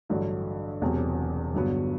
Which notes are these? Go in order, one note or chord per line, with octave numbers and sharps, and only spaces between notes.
A1 G2 D3 F#3
E1 E2 C3 F#3
G1 G2 F#3 B3